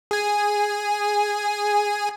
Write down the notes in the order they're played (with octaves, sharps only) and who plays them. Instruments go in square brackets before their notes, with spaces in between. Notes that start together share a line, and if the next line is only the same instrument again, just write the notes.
[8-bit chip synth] G#4 G#5